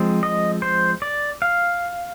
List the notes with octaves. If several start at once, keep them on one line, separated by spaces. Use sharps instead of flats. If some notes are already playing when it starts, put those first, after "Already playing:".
Already playing: F3 G#3 C4
D#5
C5
D5
F5